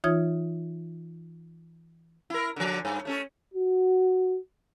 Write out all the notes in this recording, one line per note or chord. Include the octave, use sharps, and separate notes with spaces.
E3 D#4 F4 C#5 D#6 G#6
E4 A#4
D3 F3
G2
A3 C#4 A4
F#4